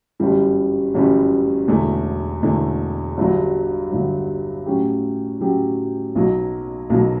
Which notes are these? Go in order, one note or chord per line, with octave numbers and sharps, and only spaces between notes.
G1 F#2 E3 G3 C#4
G1 F#2 E3 G3 C#4
E1 E2 D3 A3 E4
E1 E2 D3 A3 E4
G1 G2 D3 F#3
G1 G2 D3 F#3
A2 F#3 C#4 G4
A2 F#3 C#4 G4
B1 B2 F#3
B1 B2 F#3